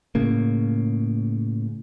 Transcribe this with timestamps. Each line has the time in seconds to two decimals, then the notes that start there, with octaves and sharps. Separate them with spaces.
0.15 A2 C#3 A#3